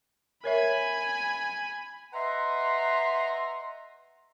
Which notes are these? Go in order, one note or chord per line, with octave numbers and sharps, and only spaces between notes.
A#4 C#5 E5 G#5 B5
B4 D#5 E5 F#5 A#5 C6